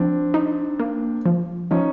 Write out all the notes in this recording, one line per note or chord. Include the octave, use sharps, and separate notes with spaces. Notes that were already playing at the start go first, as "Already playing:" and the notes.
Already playing: F3 C4 D4
D#4
A#3
F3
F3 C#4 D#4